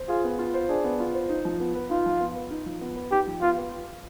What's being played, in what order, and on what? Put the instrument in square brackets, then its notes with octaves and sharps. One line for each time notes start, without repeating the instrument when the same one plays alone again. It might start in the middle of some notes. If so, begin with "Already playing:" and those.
Already playing: [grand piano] C5
[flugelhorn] F4 [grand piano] G#4
[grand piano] B3
F4
C5
[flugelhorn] D4 [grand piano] G#4
[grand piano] B3
F4
C5
D#4
F3
B3
B4
[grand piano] D#4 [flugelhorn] F4
[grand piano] F3
B3
B4
D#4
F3
B3
B4
[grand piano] D#4 [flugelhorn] G4
[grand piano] F3
[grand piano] B3 [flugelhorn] F4
[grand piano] B4